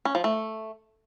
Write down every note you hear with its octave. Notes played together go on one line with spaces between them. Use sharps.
C#4
F3
A3